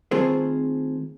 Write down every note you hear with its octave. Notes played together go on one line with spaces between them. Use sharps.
D#3 A3 C4 F4 G#4 C5